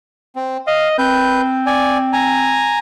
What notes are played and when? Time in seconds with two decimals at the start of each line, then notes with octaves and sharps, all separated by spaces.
0.36 C4
0.67 D#5 F5
0.98 C4 B4 G6
1.67 D5 G#5
2.13 G#5 A#5